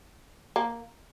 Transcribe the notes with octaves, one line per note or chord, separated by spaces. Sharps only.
A#3